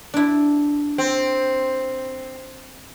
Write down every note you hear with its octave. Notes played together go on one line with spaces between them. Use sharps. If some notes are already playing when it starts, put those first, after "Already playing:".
D4 E4
C4